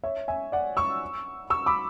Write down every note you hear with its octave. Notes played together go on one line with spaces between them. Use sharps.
C#5 E5
E5 G#5
D5 F#5
C#6 E6
C#6 E6
B5 D6